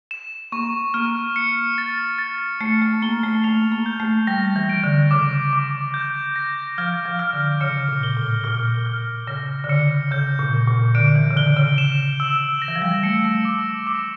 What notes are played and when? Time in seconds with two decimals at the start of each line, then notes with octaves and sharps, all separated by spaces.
0.11 E7
0.52 A#3 C#6
0.94 A#3 F6
1.36 C#7
1.78 A6
2.18 A6
2.61 A3 C#7
2.82 A3
3.02 A#3 G7
3.24 A3
3.44 A3 F7
3.72 A#3
3.86 G6
4.00 A3
4.27 G3 A#6
4.56 E3
4.69 D7
4.84 D3
5.11 C#3 D6
5.53 D6
5.94 G6
6.36 A#6
6.78 F3 F6
7.05 F3
7.19 F6
7.33 D3
7.61 C#3 C#7
7.89 A#2
8.03 G7
8.17 A2
8.44 A#2 F6
8.86 F6
9.27 C#3 A#6
9.64 D3
9.70 C#3 C#7
10.11 C#3 G6
10.39 A#2
10.53 G6
10.67 A#2
10.95 D3 D7
11.15 E3
11.31 C#3
11.36 D3 G7
11.57 C#3
11.78 E7
12.20 E6
12.62 A#6
12.68 E3
12.76 F3
12.82 G3
13.03 A3 C#7
13.24 A3
13.45 D6
13.87 D6